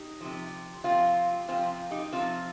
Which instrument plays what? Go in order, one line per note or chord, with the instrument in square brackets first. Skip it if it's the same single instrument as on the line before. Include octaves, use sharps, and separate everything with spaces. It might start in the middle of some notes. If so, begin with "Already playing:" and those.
Already playing: [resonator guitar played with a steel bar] D#4 G4
C3 F3
C3 F3 C4 F4
C3 F3 C4 F4
D#4 G4
C3 F3 C4 F4